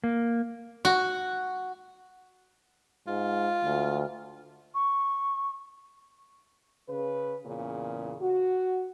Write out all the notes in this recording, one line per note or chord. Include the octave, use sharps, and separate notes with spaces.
A#3
F#4
G#2 F4
D2
C#6
C#3 B4
E2 A#2 C#3
F#4